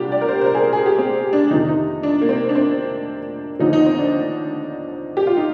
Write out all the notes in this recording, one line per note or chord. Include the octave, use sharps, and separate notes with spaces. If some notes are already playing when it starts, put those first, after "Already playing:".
Already playing: C2 A#2 D4 G4
D5
A#4
C5
C5
A#4
G#4
A#4
G#4
G4
C4
D4
F2 C3 D#3 D#4
D#4
D4
A#3
C4
D4
C4
D#2 D3 F3 D#4
D#4
C4
D4
G4
F4
D#4